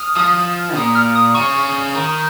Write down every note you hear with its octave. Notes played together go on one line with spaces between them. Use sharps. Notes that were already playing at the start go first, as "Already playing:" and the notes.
Already playing: D#6 F6
F3 D#6
A#2 D#6
F6
D#6
C#3 C#6
D#3